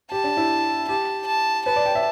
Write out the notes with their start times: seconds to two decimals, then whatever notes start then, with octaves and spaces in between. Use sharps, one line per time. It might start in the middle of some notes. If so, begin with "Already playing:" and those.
0.12 G4 A5
0.24 D4
0.37 E4
0.89 G4 A5
1.27 A5
1.66 B4 A5
1.76 D5
1.85 G5
1.95 E5